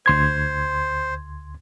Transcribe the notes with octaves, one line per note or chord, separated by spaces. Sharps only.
D2 C5 C6 G#6